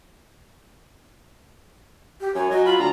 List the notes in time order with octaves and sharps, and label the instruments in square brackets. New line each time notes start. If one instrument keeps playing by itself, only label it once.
[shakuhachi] G4
[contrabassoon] F#2 [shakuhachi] C#5 [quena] G#5
[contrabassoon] F#3 [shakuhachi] D#5
[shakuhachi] F4 [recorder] B5
[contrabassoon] D2 [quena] D5 [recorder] A#5